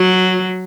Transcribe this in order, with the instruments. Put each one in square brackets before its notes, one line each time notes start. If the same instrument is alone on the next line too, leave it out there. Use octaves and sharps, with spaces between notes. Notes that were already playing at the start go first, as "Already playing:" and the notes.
Already playing: [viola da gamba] F#3